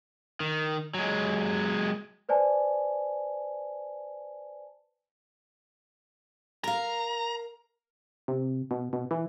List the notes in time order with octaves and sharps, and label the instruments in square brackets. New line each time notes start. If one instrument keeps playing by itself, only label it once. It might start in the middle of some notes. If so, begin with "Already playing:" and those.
[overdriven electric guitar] D#3
F#3 G#3
[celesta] B4 C5 D5 G#5 A5
[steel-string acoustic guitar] A#4 F5 [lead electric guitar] A#5
[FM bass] C3
B2
B2
E3